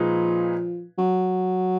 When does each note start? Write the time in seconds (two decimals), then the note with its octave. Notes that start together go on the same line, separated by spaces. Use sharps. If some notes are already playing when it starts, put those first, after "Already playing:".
Already playing: A#2 F3 G#3 D#4 G#4 B4
0.98 F#3